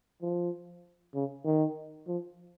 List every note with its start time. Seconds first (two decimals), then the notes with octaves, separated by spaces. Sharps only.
0.22 F3
1.15 C#3
1.45 D#3
2.08 F3